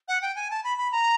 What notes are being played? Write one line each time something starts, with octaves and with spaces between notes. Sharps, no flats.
F#5
G5
G#5
A5
B5
B5
A#5